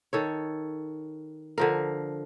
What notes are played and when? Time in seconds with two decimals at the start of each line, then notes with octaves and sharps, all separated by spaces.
0.13 D#3 A4 C#5
1.58 D3 F3 A#4